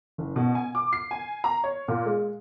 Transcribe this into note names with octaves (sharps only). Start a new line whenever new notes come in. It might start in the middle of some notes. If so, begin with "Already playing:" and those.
F#1
B2
G#5
D6
C7
G#5
A#5
C#5
A#2
G#3